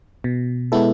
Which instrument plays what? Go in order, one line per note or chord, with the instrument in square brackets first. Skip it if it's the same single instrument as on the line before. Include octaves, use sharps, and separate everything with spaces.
[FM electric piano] B2
G#3 B3 E4 A4